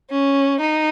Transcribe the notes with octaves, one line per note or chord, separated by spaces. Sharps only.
C#4
D#4